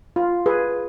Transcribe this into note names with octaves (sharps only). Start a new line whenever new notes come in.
F4
G#4 B4